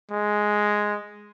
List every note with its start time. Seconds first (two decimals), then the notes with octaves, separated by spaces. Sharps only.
0.11 G#3